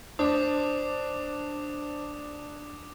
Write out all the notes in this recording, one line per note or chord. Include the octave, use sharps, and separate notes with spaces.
D4 C5 D5 D6 D#6